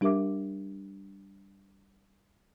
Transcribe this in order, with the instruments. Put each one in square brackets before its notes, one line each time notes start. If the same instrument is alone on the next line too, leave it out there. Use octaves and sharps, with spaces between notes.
[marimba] G3 D4 G4 A#4 E5 D6